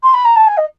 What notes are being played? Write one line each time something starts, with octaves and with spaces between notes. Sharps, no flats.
C6
B5
A#5
A5
G#5
D#5